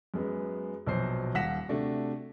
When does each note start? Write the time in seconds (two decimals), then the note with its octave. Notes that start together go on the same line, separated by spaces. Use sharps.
0.14 F#2 G#3 B3
0.86 A#1 B2 F#3 C5 C7
1.34 D#1 F5 F#5 A#6 B6 E7
1.68 C3 A3 D4 F#4